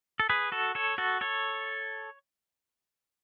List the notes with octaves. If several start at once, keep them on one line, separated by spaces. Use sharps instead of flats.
A4
G#4 B4
F#4 A4
A4 C#5
F#4 A4
A4 C#5